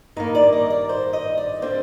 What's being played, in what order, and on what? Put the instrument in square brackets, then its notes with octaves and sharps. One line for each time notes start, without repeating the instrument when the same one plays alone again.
[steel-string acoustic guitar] G2 D#3 A#3 D#4
D5
D#5
D5
C5
D#5
D5
D3 G3 C4 C5